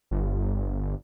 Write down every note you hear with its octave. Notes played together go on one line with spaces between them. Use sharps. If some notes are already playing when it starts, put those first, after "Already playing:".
G1